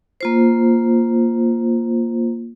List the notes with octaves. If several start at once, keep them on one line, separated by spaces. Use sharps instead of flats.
A#3 F4 C5